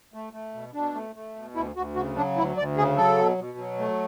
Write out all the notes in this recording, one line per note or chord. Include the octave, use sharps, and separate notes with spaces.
A3
A3
B2
B2 D4
A3
A3
B2
D2 E4
D2 F#4
C#3 F#4
F#3 D4
D2 E4
D2 D5
C#3 G#4
F#3 A4
B2
B2
F#3
A3